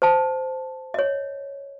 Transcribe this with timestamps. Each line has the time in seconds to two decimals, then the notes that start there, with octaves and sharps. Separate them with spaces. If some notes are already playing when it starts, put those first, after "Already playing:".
0.02 C5 A5
0.94 C#5 D#5